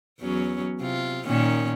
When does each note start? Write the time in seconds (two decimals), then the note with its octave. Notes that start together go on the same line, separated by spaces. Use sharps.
0.20 E2 F#3 C#4
0.80 C3 F4
1.26 A#2 D#3 C#4